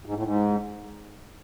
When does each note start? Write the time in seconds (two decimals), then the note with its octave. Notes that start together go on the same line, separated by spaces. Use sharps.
0.06 G#2
0.15 A2
0.23 G#2